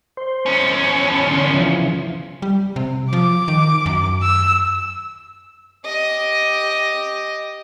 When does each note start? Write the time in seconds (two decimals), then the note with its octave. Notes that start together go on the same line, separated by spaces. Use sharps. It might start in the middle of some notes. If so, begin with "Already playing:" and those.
0.17 C5
0.46 E2 C#4
1.08 A5 B5
1.27 D3 C6
1.54 C#3 E3 F3
2.42 G3
2.76 C3
3.13 F3 D6
3.48 D#3
3.86 F#2
4.23 E6
5.86 G4 D#5